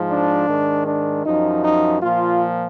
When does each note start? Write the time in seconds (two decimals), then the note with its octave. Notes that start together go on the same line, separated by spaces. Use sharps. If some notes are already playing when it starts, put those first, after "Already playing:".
Already playing: G#2 F3
0.10 D4
0.48 G#2 D#3
0.87 D4
1.26 F#2 F3 D#4
1.64 D#4
2.02 A#2 F3 F4